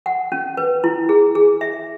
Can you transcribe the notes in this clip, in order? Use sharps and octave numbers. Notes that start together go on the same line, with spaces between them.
F#5
C#4
B4
E4
G#4
G#4
E5